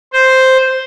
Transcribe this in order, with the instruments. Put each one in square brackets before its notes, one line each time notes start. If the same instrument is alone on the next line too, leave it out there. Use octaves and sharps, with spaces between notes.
[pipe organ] C5